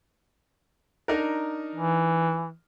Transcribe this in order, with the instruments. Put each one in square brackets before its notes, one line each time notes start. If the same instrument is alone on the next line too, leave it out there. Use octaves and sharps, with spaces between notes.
[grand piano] D4 D#4 A#4
[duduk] E3